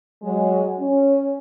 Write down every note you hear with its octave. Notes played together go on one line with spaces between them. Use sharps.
F#3 G#3
C#4